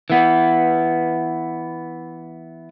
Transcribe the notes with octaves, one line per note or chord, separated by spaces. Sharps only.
E3 B3